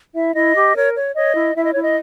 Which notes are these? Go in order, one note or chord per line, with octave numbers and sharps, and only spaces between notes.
E4 E5
E4 D#5
G4
A#4 C#5
C#5
C#5 D#5
E4
E4 E5
D#5
E4 C#5
D#5